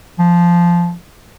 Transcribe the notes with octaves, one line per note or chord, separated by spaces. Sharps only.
F3